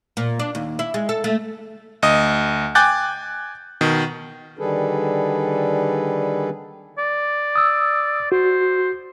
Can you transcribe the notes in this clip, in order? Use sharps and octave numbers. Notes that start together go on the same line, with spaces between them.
A#2
D4
D#2
E4
G#3
A4
A3
D2 D#5 D#6
G5 G#5 D6 F#6 G6 A6
B2 D#3
D3 D#3 G3 G#4 A4 B4
D5
D#6 E6
F#4 C5